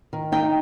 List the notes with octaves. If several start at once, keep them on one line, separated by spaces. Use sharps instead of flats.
D#3
D#4 G5